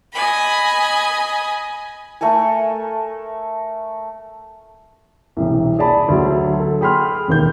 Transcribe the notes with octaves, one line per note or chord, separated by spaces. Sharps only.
D#5 G#5 B5
A3 A4 A#4 G#5
E1 C2
G#4 D5 A5 B5
D2 F#3
A4
G#4 G5 B5 C6 F6
E1 D#2 G6